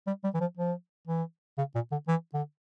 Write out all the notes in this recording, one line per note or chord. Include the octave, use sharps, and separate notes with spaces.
G3
G3
E3
F3
F3
E3
C#3
A#2
D3
E3
D3